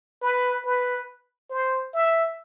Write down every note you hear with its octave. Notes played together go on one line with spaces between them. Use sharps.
B4
B4
C5
E5